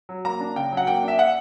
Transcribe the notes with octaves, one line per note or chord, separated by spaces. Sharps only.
F#3
A#3 A#5
D4
C#3 G5
F#3
F#5
A#3 G5
D4
E5
F#5